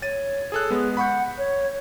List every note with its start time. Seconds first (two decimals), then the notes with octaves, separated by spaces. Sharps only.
0.02 C#5 A6 D#7
0.52 G#4 A4 F#6
0.70 G#3 B3 G#4
0.97 F#5 B5 C#6 G6
1.38 C#5